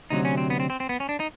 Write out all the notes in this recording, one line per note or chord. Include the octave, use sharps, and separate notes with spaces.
D2 C3 D#3 F#3 D#4
C#4
C4
B3
C4
C4
C4
B3
C#4
D4
D#4